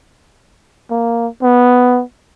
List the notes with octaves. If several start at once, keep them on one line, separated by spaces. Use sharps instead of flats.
A#3
B3